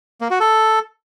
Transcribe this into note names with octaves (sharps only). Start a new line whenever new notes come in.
A#3
F#4
A4